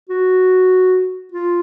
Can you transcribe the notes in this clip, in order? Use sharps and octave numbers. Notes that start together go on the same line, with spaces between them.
F#4
F4